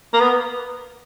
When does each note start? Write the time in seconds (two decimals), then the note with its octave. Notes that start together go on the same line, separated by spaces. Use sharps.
0.13 A#3
0.20 B3